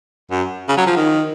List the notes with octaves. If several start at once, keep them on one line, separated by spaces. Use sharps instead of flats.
F#2
C#3
F#3
F3
D#3